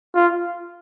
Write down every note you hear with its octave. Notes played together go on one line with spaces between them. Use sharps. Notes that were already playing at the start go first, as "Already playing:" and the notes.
F4